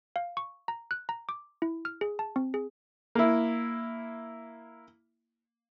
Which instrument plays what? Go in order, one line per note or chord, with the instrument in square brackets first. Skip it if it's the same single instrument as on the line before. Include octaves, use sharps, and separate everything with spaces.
[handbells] F5
C#6
A#5
F#6
A#5
D6
E4
F6
G#4
A5
C4
G#4
[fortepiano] A#3 E4